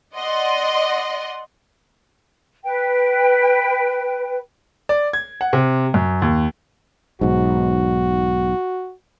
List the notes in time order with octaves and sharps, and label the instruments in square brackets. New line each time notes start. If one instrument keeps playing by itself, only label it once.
[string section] D5 D#5 F#5 C6
[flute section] B4 G5
[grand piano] D5
G#6
F#5
C3
F#2
D#2
[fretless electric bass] B1 G#2 [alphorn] F#4